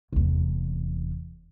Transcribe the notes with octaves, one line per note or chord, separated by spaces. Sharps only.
F1 E2